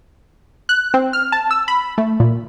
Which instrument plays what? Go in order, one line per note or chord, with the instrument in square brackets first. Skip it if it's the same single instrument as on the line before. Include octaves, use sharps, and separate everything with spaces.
[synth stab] F#6
C4
F6
A5
E6
B5
A3
A#2